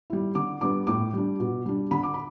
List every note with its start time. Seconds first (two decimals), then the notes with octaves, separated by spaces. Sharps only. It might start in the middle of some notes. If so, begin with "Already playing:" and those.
0.10 G3 E4
0.35 D3 D6
0.61 G3 B3 D4 D6
0.87 A2 D6
1.14 G3 D4
1.40 B2
1.66 G3 D4
1.91 D3 B5
2.03 D6
2.14 B5